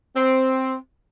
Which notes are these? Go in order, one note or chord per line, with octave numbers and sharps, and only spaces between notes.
C4